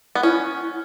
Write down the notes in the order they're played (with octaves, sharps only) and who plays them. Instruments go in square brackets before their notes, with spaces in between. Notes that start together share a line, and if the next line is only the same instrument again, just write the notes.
[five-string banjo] B3
[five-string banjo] C#4 [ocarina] E4